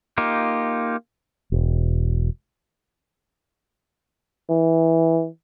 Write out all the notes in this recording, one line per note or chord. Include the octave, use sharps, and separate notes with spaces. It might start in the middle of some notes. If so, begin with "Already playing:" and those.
A#3 D#4 F4 G4
E1
E3